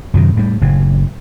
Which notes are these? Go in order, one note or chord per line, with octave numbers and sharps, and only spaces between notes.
F#2 C3 D#3
A2 G3
F#1 A2 C#3